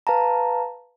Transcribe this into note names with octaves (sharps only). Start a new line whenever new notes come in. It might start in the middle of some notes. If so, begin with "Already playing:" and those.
B4 F5 A5 A#5